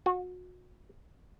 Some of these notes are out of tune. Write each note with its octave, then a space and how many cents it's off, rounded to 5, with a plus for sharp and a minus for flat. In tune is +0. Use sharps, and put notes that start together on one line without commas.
F#4 -30